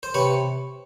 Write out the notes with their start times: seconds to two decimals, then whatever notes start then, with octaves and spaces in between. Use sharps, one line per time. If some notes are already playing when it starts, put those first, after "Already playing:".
0.03 C5
0.14 C3 B4 C#5